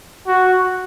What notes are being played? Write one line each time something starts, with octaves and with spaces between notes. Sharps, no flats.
F#4